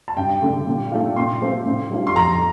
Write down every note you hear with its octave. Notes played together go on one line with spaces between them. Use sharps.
A5
G2 G5
D3 A3
A#2
A3 D4 F4
A#2 C6
A3 C4 F4
A2
G3 D4 F4
C6
F2 A#5